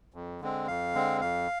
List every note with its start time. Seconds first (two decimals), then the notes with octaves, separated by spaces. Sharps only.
0.14 F2
0.41 D3 G#3 C4
0.67 F2 F5
0.94 D3 G#3 C4
1.21 F2 F5